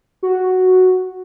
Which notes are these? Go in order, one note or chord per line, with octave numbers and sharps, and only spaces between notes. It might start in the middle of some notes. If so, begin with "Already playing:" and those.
F#4